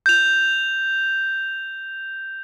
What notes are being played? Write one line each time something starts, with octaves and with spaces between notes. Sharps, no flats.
G6 F7